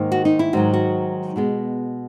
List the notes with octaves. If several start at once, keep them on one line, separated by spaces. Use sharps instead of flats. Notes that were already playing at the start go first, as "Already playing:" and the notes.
Already playing: G#2 D#3 A#3
F#4
D#4
E4
G#2 D#3 F#3 F#4
F#4
B2 G#3 B3